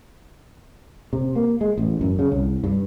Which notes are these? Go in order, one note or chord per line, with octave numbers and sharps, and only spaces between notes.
C3
A#3
G#3
A1
F#2
C#3
C2
G2